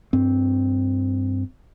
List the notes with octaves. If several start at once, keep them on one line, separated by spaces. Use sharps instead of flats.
G2 C4